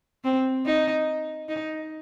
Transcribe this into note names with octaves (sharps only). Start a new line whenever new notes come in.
C4
D#4
D#4